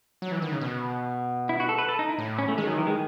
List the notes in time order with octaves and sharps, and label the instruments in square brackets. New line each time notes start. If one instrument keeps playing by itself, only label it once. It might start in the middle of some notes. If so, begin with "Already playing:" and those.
[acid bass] F#3
E3
D#3
C#3
B2
[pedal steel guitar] E4
F#4
A4
B4
A4
D#4
E4
[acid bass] A2
[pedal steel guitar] C#4
A3
[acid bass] D#3 [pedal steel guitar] G#3
[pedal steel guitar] F#3
E3
G#3